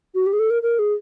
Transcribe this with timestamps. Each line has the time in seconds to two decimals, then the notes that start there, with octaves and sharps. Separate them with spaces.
0.14 F#4
0.26 G4
0.32 G#4
0.39 A4
0.50 A#4
0.62 A#4
0.78 G#4